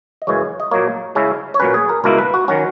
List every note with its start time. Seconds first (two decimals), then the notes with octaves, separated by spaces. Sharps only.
0.22 D#5
0.27 F#2 C#3 E3 G#3 C#5
0.60 D#5
0.71 A#2 F#3 A#3 C#5
1.15 C#3 G#3 C#4 E4
1.54 C#5
1.60 A#2 F#3 C#4 B4
1.74 G#4
1.89 A#4
2.04 C#2 B2 A#3 E4 A#4
2.18 B4
2.34 F#4
2.48 D#3 F#3 C#4 F#4